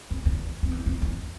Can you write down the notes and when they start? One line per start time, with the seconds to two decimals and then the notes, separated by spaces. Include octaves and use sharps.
0.11 F2
0.25 E2
0.63 F2
0.71 E2
0.86 F2
1.02 E2